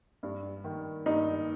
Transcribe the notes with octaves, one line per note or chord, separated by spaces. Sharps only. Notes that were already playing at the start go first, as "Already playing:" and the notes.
G2
D#3
G2 D#4